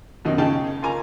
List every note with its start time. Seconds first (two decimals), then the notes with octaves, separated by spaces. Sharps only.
0.25 F#2 B2 D#3 D#5
0.38 C#3 D#4 G#4 G5 A5
0.83 F4 A#4 G#5 A#5